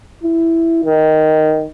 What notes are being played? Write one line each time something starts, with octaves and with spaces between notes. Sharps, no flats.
E4
D#3